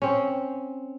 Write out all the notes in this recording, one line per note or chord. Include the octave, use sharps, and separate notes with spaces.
C4 C#4